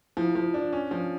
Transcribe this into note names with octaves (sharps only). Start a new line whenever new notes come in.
F3 E4
F3
D4
C#4
F3